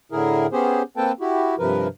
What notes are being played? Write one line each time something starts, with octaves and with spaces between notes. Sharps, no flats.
A2 D3 E4 G#4 A#4
B3 C#4 G4 G#4 C5
A#3 C4 A4 B4 G5 A5
E4 F#4 G4
G2 C3 F3 A#4 B4